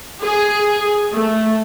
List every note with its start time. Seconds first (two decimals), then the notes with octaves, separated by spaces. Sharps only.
0.24 G#4
1.13 A3